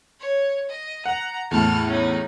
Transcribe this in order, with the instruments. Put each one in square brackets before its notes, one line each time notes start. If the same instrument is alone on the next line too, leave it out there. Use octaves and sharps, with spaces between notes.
[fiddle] C#5
D#5
[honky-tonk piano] F#5 [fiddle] A#5
[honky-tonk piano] E2 A2 [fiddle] A5 F6
[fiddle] C#4 D#4